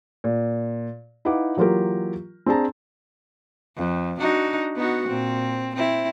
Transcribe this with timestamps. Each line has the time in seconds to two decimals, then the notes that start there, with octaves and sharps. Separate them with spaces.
0.24 A#2
1.25 D#4 E4 B4 F5 F#5 D6
1.57 E3 F#3 A#3 F4 G4 A#4
2.46 C4 D4 G#4 A5 A#5
3.77 F2
4.19 D4 D#4 F#4
4.76 B3 D#4 F#4
5.08 A#2 C4
5.75 C4 E4